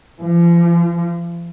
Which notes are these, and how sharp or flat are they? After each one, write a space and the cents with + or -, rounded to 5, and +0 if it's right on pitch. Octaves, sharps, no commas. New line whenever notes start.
F3 -40